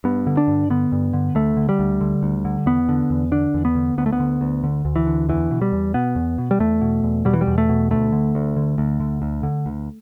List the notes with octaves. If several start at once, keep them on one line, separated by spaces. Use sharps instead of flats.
G2 B3
D3
D4
G2
D3 B3
G2
D3
D2 A3
D3
G3
D2
D3
D2
D3
E2 B3
D3
E2
D3 D4
E2
B3
D3
D2 B3
A3
B3
D3
D2
D3
D2
E3
D3
E2 E3
B2
G3
E2
B2 B3
E2
B2
G3
E2 A3
B2
E2
B2 G3
E3
G3
E2
A3
B2
D2 A3
D3
D2
D3
D2
D3
D2
D3
D2